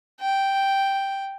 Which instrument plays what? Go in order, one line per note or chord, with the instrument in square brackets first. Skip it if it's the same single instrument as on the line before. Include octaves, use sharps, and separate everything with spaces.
[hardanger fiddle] G5